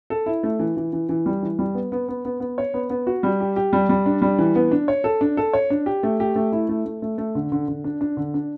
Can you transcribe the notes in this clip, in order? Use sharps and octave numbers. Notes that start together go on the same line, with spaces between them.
A4
E4
A3
E3
E3
E3
E3
G3
E3
G3
B3
B3
B3
B3
B3
C#5
B3
B3
F#4
G3
G4
G4
G3
G3
D4
G3
E3
B3
D4
C#5
A4
D4
A4
C#5
D4
G4
A3
G4
A3
E4
A3
A3
A3
A3
D3
D3
D3
D4
D4
D3
D4